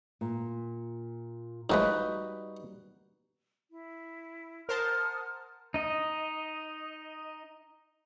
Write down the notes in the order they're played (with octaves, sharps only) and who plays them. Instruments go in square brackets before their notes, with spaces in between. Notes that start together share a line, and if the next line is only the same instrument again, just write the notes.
[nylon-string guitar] A#2
[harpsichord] A2 F3 G#3 [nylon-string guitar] G3 [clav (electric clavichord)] D#4 F#4 B4
[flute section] E4
[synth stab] A#4 C5 A5 [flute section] F#5 D#6 F6
[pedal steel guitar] D#4 D#5